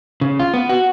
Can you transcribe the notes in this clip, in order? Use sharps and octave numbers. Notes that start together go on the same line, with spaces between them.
C#3
F4
B3
F#4